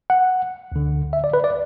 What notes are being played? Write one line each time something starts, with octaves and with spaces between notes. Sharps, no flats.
F#5
D2 D3
E5
D5
B4
D5